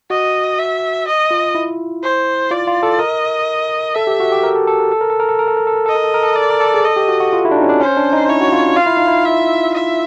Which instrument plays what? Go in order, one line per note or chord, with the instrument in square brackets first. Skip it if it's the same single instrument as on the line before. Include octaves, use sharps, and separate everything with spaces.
[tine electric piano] F#4 [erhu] D#5
[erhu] E5
D#5
[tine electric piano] F4
E4
[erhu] C5
[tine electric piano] F4 [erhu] D5
[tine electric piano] F4
A4
[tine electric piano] A#4 [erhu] D#5
[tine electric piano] A4 [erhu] E5
[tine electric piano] G4
F#4
G4
A#4
A4
A4
A#4
A4
A#4
A4
A#4
A4
A#4
A4
A#4
A4
A#4
[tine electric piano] A4 [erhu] D#5
[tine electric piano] A#4
A4
A#4
A4
[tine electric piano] A#4 [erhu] D5
[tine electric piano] A4
A#4
A4
G#4
[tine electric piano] A4 [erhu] D#5
[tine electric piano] G4
F#4
F#4
F4
E4
D4
D#4
C#4
D4
[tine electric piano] C#4 [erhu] C5
[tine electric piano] D4
D#4
[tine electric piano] E4 [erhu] C#5
[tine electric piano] F#4
F4
[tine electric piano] F4 [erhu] F5
[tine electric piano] E4
D#4
E4
[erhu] E5
E5